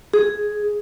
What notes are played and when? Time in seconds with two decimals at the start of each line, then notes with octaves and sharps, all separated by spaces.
0.14 G#4